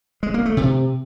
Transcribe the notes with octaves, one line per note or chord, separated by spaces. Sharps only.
G#3
A#3
A3
C3